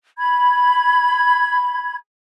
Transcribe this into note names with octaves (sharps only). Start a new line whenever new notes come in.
B5 G#6